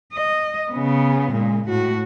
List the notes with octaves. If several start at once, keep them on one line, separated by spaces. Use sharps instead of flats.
D#5
C#3 B3
A#2 G#3
A2 F#4